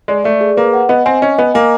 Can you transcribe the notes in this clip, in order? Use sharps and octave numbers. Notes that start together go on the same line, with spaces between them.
G#3 D5
A3 D5
G#4
A#3 B4
F#5
B3 D#5
C4 G#5
C#4 D#5
B3 D#5
A#3 G#5